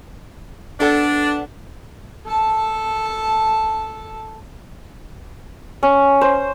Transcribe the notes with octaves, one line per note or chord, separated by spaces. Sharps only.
B3 D4 A4 F#5
A4 A5
C#4
C5